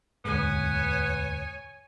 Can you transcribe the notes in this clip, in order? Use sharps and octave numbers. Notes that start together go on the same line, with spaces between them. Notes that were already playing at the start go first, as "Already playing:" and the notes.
E1 D2 G#2 B3 C#5 G#5